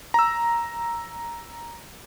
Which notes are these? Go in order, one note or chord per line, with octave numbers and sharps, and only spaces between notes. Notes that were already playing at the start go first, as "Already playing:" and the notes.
A#5 E6